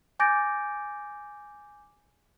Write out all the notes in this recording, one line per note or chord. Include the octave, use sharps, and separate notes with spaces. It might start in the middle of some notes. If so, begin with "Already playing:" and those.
G#5 D6 G6 A6 A#6 D7